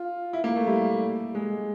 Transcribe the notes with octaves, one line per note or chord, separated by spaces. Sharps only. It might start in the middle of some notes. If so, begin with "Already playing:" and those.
Already playing: F4
E4
A#3
A3
G3
G#3